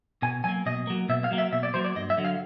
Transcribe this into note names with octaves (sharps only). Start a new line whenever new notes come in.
B2 G#5
F#3 A#3 G#5
B2 D#5
F#3 A#3
B2 E5
F5
F#3 A#3
E5
B2 E5
D5
F#3 A#3 C5
D5
G2 D#5
E5
D3 F#3
F5